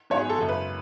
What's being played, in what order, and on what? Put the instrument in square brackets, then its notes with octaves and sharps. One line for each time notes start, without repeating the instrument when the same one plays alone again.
[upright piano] G#2 F#3 B3 C#5
G#4
A4
F#1 F#2 C#3
B4